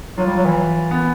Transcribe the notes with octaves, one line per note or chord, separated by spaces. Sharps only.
F#3 F4
G3
F#3
E3
B3